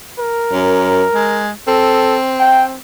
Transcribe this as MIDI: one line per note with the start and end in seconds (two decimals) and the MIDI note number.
0.19 1.46 70
0.52 1.05 42
1.14 1.51 56
1.68 2.76 60
1.68 2.17 69
2.40 2.65 79